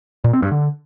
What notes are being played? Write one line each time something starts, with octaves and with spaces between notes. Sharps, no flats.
A#2
C4
G2
D3